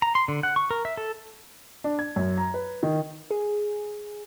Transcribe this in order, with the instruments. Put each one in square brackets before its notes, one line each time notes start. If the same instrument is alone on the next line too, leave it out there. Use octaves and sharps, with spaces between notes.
[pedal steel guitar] A#5
C6
D3
F#5
C#6
A#4
E5
A4
[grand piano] D4
G#6
F#2
A#5
B4
D#3
[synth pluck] G#4